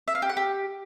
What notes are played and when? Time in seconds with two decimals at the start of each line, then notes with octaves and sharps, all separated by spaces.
0.08 E5
0.15 F5
0.22 G4
0.29 F#5
0.37 G4